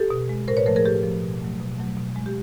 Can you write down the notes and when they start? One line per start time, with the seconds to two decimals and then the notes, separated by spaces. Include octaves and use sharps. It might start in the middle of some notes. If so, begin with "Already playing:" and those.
Already playing: G4 A4
0.10 B2
0.29 G#3
0.48 A2 A#4 C5
0.57 B4 C#5
0.66 F3 A3 A#4 C5
0.76 G#4 A#4
0.85 A2 G4 A4
1.03 F3 A3
1.22 B2
1.42 F#3 A3
1.60 B2
1.78 F#3 A3
1.97 B2
2.16 G#3
2.26 G4